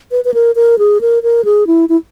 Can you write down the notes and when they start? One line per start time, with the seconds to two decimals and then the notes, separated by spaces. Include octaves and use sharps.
0.11 B4
0.25 B4
0.34 A#4
0.55 A#4
0.79 G#4
1.01 A#4
1.23 A#4
1.45 G#4
1.67 E4
1.89 E4